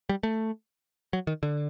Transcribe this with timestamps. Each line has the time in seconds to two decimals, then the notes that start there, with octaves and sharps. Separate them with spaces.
0.09 G3
0.23 A3
1.13 F#3
1.27 D#3
1.43 D3